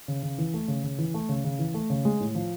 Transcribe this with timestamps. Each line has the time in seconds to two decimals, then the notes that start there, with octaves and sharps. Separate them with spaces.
0.08 C#3
0.23 C#3
0.38 E3
0.54 A3
0.68 C#3
0.84 C#3
0.98 E3
1.14 A3
1.29 C#3
1.44 C#3
1.59 E3
1.74 A3
1.90 C#3
2.05 G#3
2.21 A2
2.35 F3